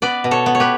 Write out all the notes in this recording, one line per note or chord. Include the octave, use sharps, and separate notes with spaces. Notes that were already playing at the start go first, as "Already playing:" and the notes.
B3 B4 D5
B2
A4 C#5
B3
C#5
G4 B4